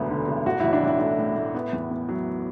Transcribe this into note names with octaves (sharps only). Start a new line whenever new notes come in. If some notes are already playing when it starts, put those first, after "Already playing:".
Already playing: E1 D2 D3 B3
D3
E1
A1 F#4
A1 E4
D4
A1 E4
A3 E4
A2
A2
B3
E2
B3
F#3